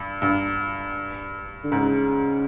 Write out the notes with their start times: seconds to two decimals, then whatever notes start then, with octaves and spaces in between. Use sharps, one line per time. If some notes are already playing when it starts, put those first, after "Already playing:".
Already playing: G2
0.22 G2
1.64 D3
1.72 G#2 C#3